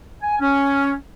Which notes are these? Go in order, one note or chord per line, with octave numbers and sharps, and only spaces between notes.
G#5
C#4